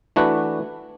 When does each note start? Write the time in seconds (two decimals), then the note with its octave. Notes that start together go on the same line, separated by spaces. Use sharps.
0.16 E3 A3 D4 F#4 B4